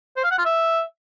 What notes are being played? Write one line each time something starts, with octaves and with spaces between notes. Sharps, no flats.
C5
F5
F#5
F4
E5